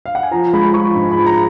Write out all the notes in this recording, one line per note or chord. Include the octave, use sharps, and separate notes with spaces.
F5
F#5
G#5
F3 A#5
G#3 B5
F3 C#6
G#2 B5
F3 B5
A#5